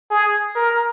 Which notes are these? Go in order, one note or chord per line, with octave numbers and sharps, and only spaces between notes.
G#4
A#4